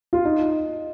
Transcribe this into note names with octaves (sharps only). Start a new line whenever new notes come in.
F4
D#4